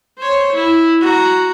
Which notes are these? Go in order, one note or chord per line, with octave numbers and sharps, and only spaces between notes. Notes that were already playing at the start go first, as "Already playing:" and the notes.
C5 C#5
E4
F#4 A#5